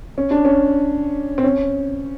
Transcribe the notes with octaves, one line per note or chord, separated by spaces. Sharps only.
C#4
D4
C#4
C4
C#4